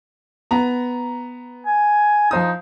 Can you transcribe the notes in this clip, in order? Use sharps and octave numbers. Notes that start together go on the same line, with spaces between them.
B3 A#5
G#5
F3 D#4 C5 D#6